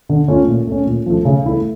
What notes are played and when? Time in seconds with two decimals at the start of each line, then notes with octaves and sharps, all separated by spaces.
0.09 D3
0.28 A3 C#4 F4
0.48 A#2
0.67 A3 C#4
0.87 A#2
1.06 F3 A3
1.25 C#3
1.45 E3 A3 E4 A4